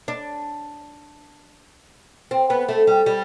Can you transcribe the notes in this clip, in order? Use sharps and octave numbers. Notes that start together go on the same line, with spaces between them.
D4
C4
B3
A3
G3
G3